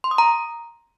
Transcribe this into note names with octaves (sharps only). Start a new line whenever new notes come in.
C6
D#6
A#5